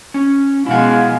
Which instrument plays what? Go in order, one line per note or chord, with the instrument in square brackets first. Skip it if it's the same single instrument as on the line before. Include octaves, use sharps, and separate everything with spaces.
[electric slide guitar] C#4
[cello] B2 F3 [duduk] G#3 [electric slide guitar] E4 F#5 [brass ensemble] F5 G#5